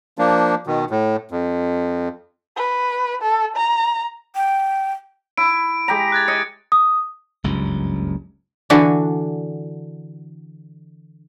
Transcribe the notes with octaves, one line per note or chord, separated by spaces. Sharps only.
F3 A#3 D4
B2 D#3
A2
F2
B4
A4
A#5
G5
E4 D7
G#3 G4 A#5
F#6 G#6 A6
D#5 C#7
D#6
F#1 C#2 G2
D3 E3 D4 F#4